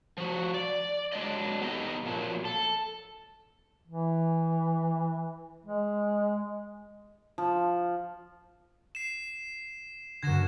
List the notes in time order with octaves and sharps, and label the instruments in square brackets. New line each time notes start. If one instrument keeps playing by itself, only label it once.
[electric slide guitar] F3 F#4
D5
F#3 G#3 D4 D5 D#5
B3 D#4 G4 A4 D#5
A#2 F3 F#3
A4
[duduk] E3
G#3
[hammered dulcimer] F3
[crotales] C7 E7
[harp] F#2 D3 [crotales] G#6 A#6 E7